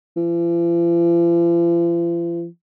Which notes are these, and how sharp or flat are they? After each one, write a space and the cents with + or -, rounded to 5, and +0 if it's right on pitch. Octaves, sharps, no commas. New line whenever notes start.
F3 -45